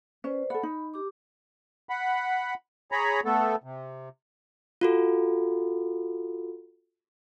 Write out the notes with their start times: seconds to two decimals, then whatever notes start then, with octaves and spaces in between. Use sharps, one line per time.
0.24 C#4 B4 C5 D5
0.50 A4 F#5 B5
0.63 D#4
0.94 G4 D6
1.89 F#5 B5
2.92 G#4 C#5 A#5 B5
3.25 A3 B3 A4
3.64 C3
4.81 F4 F#4 A4